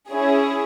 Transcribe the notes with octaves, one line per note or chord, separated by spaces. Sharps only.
C#4 E4 G#4